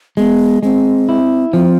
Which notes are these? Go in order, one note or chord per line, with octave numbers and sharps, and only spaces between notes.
G#3 B3
G#3 C4
E4
F3 C4